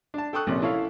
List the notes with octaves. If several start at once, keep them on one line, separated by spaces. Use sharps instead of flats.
D4 A5
A4 G5 C#6 D#6 F#6
A#1 C3 C#4
E4 A4 C#5 F5